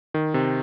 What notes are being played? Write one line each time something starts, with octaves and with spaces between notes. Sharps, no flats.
D#3
C3